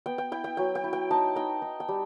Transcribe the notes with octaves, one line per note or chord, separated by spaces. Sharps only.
B3 G5
G5
E4 G5
G5
F#3 G5
G5
E4
G5
D#4 A5
D#4 G5
D#4
G5
G3